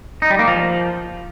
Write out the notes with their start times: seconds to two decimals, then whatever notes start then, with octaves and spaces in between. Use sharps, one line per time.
0.22 D#4
0.31 G3
0.39 A#3
0.47 F3